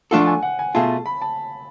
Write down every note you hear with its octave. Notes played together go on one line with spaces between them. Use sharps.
F3 A3 D4 F4 A4 F#5
G#5
F#5
G#5
B2 A3 F4 G#4 A5
B5
A5